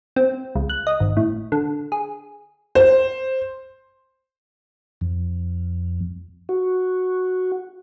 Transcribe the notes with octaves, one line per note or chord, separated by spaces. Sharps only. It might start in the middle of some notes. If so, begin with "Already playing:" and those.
C4
C#2
F#6
D#5
G#1
A2
D3
G#4
C5
F2
F#4